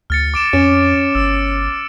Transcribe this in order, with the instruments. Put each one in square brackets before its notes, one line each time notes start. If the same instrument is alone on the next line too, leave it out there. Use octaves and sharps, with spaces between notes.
[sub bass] D2 [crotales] F6 A6 C#7
[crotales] D6 D7 E7
[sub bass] F2 [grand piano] C#4
[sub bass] G1 [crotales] E6